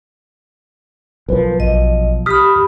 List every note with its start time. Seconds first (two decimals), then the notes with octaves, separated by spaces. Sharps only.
1.29 B1 F3 A#4 B4
1.60 A#1 D#5
2.26 G4 B5 D#6 F6 B6